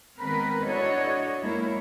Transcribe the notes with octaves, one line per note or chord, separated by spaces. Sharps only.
D#3 G#3 B3 C4 A#4 B4
D4 E4 F#4 A4 C#5 D#5
F#2 G#3 A#3 E4 C#5